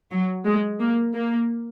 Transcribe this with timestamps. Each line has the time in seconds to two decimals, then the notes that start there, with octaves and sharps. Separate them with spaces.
0.11 F#3
0.46 G#3
0.79 A#3
1.14 A#3